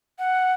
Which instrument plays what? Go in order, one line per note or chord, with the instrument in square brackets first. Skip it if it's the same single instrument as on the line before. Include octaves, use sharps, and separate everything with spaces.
[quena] F#5